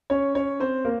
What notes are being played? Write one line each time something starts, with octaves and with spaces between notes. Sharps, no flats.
C#4 C#5
C#4 C#5
C4 C5
A#3 A#4